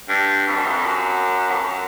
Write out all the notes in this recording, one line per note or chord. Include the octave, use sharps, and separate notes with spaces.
G2
F2
F#2
F2
F#2
F2
F#2